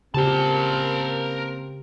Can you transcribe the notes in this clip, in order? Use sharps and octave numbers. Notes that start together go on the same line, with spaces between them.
C#3 A#3 C4 G4 A#4 A5